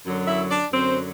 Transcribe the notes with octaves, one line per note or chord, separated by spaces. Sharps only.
F#2 D3 F#3
E4 E5
D4 D5
F#2 D3 F#3 C4 C5